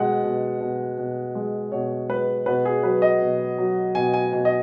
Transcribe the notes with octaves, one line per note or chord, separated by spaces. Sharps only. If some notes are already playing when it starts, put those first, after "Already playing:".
Already playing: B2 G#3 F#5
B2
B2
B2
G#3
B2 C#5
G#3 B4
B2 B4
G#4
F#3 B4
D#5
B2
F#3
B2 G#5
G#5
B2 G#5
D#5